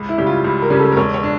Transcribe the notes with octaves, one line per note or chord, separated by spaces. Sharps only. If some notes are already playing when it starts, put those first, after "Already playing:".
Already playing: C#2
E4
C#3 G3 C#4 G4
F4
C#2
A#4
C#3 G3 C#4 G4
A4
A#4
E1 C#5
C#5
D4